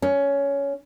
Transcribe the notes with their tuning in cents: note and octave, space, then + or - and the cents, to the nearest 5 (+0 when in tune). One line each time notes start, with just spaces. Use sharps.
C#4 +15